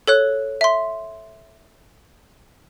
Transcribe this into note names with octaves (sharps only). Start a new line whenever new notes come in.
A4 C#5 F#6
E5 C6